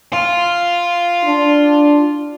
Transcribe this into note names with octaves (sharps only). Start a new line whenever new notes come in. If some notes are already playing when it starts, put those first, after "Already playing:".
F4
D4